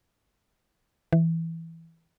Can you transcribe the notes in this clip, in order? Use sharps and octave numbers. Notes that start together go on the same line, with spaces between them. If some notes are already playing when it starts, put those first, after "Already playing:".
E3